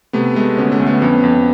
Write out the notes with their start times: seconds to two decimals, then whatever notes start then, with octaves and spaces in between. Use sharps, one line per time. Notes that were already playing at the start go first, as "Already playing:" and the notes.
0.13 C3 A3 B3
0.35 G#3 A3 B3
0.57 D2 B3 C#4
0.72 A3 B3
0.80 D2
0.86 A3 B3
1.01 F2 B3 C#4
1.24 F2